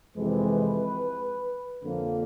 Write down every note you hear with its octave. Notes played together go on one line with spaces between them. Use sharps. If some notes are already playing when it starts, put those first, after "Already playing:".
F2 C3 E3 G#3 B4
F2 D3 F3 A#3